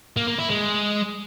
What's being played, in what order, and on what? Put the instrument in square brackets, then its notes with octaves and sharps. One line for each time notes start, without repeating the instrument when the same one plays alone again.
[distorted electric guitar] A#3
A#3
E4
G#3